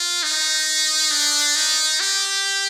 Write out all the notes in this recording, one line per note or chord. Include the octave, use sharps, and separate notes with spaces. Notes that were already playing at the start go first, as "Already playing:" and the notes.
Already playing: F4
D#4
D4
D#4
G4